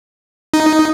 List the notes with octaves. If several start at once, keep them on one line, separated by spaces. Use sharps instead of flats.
D#4